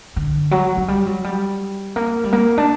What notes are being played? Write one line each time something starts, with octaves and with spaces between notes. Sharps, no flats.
D3
F#3
F#3
G3
F#3
G3
A#3
G3
A#3
D4